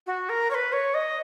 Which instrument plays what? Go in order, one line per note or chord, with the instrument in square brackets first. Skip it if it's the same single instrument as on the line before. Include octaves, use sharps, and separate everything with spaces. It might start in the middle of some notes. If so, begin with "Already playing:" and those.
[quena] F#4
A#4
C#5
B4
C#5
D#5